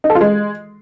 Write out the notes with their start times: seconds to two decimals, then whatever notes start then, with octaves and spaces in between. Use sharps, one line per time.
0.04 D#4
0.10 A4
0.15 F4
0.21 G#3